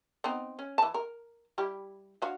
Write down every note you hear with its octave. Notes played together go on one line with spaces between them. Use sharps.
B3 C4 D#4
C#4
E3 A5
A#4
G3 E4 G4
D4 F#4 F5